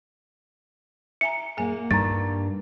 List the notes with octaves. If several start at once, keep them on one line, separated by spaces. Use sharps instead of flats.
E5 G#5 A#5 C#7
A#2 A#3 G#4 F#5 G#5
G2 G3 D#4 A#5 A6